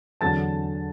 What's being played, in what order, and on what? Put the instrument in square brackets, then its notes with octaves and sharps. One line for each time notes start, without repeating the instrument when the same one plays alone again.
[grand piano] E2 D3 F#3 A5 A6